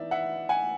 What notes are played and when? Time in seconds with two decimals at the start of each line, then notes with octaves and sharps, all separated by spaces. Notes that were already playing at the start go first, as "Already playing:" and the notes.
Already playing: E3 B3 D#4 D5 E5
0.11 E5 F#5
0.49 F#5 G#5